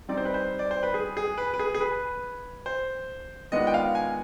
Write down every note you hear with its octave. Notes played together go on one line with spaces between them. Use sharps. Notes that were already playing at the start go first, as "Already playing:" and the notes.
G3 C4 D#4 D5
C5
B4
C5
D5
C5
B4
G#4
G#4
B4
B4
G#4
G#4
B4
C5
D#3 G#3 B3 D4 F4 D#5
G5
F5
G#5